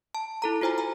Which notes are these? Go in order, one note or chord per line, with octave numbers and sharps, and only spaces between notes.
A5
E4 A4 A#5
F4 F#4 C5 G#5 A#5
G#5 A#5